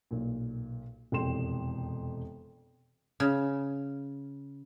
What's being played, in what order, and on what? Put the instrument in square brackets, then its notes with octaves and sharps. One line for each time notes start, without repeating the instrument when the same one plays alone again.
[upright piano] B1 A#2
E1 F2 C3 G5 C6 E7
[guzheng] C#3